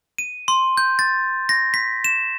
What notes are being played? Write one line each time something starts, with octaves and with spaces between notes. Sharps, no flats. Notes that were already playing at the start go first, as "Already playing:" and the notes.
D#7
C6
G6
A6
A#6
B6
E7